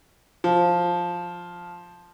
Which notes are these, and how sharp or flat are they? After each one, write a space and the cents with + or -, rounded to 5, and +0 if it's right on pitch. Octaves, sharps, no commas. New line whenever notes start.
F3 +5